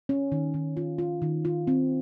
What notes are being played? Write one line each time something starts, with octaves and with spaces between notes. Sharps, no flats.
C#4
D#3
D#3
F4
F4
D#3
F4
C4